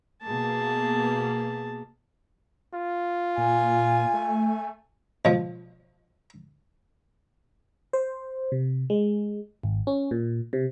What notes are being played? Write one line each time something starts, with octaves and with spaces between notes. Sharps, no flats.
B2 A#3 G#4 A5
F4
A#2 G#5
A3
B2 F3
C5
C3
G#3
G#1
C#4
A#2
C3